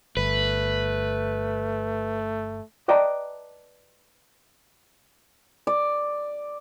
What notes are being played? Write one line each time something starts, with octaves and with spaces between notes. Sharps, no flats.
G1 A3 B4
B4 D5 D#5 G5 A5 A#5
D5